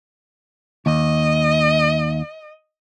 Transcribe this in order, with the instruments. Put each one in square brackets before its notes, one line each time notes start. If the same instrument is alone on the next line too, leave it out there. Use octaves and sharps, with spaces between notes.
[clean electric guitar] D#2 [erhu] D#5